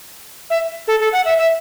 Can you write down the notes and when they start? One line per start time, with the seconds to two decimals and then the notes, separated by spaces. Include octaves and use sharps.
0.50 E5
0.88 A4
1.00 A4
1.13 F#5
1.25 E5
1.38 E5